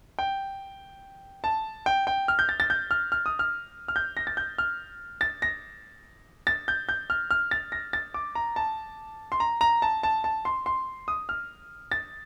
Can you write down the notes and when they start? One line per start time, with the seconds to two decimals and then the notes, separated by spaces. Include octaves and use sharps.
0.19 G5
1.44 A5
1.86 G5
2.07 G5
2.28 F6
2.39 G6
2.49 A6
2.60 A6
2.70 G6
2.91 F6
3.12 F6
3.26 D#6
3.39 F6
3.88 F6
3.96 G6
4.17 A#6
4.27 A6
4.37 G6
4.58 F6
5.21 A6
5.42 A#6
6.47 A6
6.68 G6
6.89 G6
7.10 F6
7.31 F6
7.51 A6
7.72 A#6
7.93 A6
8.14 D6
8.35 A#5
8.56 A5
9.32 C6
9.40 A#5
9.61 A#5
9.82 A5
10.03 A5
10.24 A5
10.45 C6
10.66 C6
11.08 D#6
11.29 F6
11.92 A6